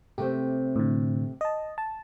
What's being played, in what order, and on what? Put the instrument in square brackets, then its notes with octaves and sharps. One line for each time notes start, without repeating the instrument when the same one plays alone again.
[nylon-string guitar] C3 A3 C4 [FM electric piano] G4
[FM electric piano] A2 D3
D#5 A5
A5